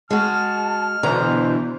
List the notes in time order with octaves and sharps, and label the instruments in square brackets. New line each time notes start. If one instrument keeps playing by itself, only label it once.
[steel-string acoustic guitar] G#3 F#4 [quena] A5 [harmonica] F6
[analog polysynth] B2 D3 E3 [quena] C5 [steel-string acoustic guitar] A#5